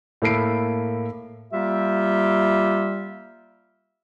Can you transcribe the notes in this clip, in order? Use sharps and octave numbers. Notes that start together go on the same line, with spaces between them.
A2 A#3 A4 B5 C7 D7
G3 A#3 F4 G4 E5